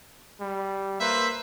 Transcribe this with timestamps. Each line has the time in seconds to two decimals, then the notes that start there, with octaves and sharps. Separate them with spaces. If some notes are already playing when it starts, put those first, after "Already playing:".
0.41 G3
1.00 A#3 B4 C5 E5